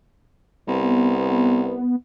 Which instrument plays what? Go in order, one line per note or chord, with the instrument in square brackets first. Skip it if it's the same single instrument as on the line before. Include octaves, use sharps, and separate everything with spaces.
[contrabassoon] C2 [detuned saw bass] B3